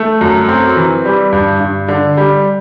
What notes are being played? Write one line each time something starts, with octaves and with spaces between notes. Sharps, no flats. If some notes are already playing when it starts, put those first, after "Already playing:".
Already playing: A3
F#2
C4
E3
G3
G2
G2
D3
G3